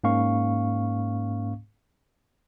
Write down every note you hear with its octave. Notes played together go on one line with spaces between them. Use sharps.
G#2 A#3 C#4 F5 C#6